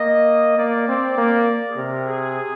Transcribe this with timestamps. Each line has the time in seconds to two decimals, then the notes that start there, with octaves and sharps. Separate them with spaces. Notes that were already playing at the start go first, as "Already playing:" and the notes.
Already playing: A#3 D#5
0.58 A#3 D5
0.88 C4
1.18 A#3
1.69 G#4
1.76 C3 A#4
2.07 G#4